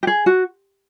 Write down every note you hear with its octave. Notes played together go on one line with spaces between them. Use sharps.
G4
G#4
F#4